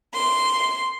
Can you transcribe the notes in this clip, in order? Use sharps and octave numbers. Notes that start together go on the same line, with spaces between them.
C6